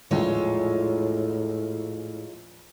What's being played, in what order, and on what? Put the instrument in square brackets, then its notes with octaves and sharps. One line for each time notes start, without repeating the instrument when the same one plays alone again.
[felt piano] A#1 E2 [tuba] A2 [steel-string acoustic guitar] G#3 F4 C#5